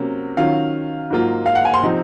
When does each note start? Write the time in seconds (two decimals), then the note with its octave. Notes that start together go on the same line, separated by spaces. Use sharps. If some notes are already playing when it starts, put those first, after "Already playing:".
Already playing: C3 F#3 A#3 C#4
0.37 D#3 F#3 C#4 F4 F5
1.10 G#2 F#3 A#3 F4
1.46 F5
1.55 F#5
1.65 G#5
1.74 C6
1.82 C3 F3 C4 D#4